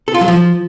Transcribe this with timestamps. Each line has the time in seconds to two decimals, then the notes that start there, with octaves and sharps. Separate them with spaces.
0.08 A4
0.14 F4
0.21 F#3
0.28 F3